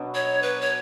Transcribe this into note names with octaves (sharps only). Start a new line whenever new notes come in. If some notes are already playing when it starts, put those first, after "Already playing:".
Already playing: B2 F#3 B3 D4
C#5
B4
C#5